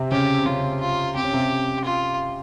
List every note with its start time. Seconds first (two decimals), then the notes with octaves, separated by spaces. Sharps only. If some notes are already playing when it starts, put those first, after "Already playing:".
Already playing: C3 C4
0.11 C#3 C#4 G4
0.40 C4
0.46 C#3 C#4 F4
0.80 F4
1.16 C4 G4
1.24 C#4
1.33 C3 C4
1.85 F4